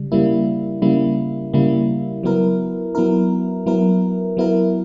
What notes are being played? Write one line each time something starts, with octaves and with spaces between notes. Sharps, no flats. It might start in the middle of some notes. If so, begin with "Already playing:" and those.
Already playing: C#3 G3
C#3 G3 A#3 E4
C#3 G3 A#3 E4
C#3 G3 A#3 E4
F#3 B3 E4 A#4
F#3 B3 E4 A#4
F#3 B3 E4 A#4
F#3 B3 E4 A#4